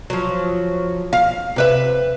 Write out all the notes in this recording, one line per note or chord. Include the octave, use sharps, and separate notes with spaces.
F3 F#3
F5
C3 B4 E5